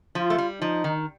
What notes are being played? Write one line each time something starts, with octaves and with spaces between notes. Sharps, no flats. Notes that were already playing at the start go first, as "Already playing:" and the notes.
F3 F4
A3
G3
F3 D#4
D#3